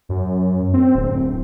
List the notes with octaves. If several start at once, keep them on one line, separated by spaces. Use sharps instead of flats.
F#2
C4
D1